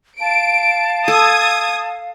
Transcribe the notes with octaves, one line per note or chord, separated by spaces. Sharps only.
F5 A5 D7
A4 D#6 G#6